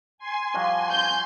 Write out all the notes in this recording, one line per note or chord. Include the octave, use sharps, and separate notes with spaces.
G#5 C6
F3 G3 F#4
G6